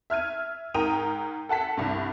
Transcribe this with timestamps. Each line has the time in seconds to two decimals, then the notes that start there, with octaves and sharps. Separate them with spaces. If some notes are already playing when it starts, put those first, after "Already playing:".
0.10 E5 F6 G#6 D#7
0.74 G#2 A#4 G5 D#6 D#7 F7
1.49 A4 F#5 A5 B6
1.77 C2 G2